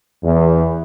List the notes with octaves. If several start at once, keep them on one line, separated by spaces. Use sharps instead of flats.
E2